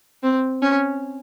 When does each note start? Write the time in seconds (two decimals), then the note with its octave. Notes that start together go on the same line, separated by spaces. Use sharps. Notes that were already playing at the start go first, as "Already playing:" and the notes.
0.23 C4
0.62 C#4